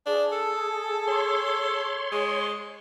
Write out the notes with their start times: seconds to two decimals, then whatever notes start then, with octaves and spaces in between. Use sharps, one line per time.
0.06 D4 G#4 A5
0.32 A4
1.08 C#5 C6
2.12 G#3